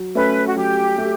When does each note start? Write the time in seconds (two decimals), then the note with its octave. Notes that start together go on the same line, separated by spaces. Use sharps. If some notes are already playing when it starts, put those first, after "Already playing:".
Already playing: F#3
0.15 A3 C#4 B4
0.47 F#4
0.56 F#3 G4
0.98 A3